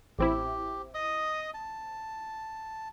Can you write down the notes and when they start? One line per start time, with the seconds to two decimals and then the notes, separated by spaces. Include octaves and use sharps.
0.19 A1 C4 E4 G4
0.94 D#5 D#6
1.54 A5